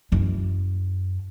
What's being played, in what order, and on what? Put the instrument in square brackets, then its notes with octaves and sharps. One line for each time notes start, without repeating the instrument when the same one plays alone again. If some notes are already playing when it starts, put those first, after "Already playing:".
[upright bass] F#2 E4